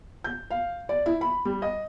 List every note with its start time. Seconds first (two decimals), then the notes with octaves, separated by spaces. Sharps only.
0.24 G6
0.50 F5
0.89 D5
1.06 E4
1.21 B5
1.45 G3
1.62 D#5